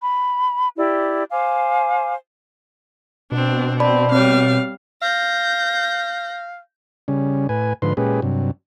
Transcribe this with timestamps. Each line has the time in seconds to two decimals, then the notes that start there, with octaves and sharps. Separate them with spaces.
0.01 B5
0.77 E4 G4 D5
1.30 C5 F5 G#5 D6
3.32 B2 C4 D4
3.80 C4 D5 A5 B5
4.12 G3 C4 C#5 F5
5.02 F5 G6 A#6
7.08 C#3 G3 C#4
7.49 A2 B4 G#5
7.82 G#2 D3 F3 B4 C6
7.97 A#2 G#3 C#4 G4 G#4 B4
8.22 G2 C3 F#3